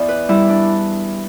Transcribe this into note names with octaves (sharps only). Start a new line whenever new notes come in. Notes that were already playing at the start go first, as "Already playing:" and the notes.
Already playing: E2 D5
B4
G3 E4
D4